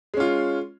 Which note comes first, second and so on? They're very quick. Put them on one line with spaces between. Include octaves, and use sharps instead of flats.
G#3 C#4 F4